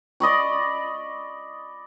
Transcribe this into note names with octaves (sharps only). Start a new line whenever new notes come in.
D5 D#5 B5 C#6